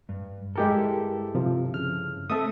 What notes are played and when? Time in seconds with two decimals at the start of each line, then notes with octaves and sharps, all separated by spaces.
0.09 G2
0.56 G2 G#3 E4 G4 A4 A#4
1.35 C3 F3
1.74 C#3 F6
2.30 A3 C4 A4 E5 D#6